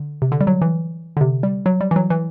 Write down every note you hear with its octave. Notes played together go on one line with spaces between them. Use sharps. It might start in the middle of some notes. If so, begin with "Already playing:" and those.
Already playing: D3
C3
D3
G3
F#3
E3
D3
C3
G3
F#3
G3
E3
F#3
E3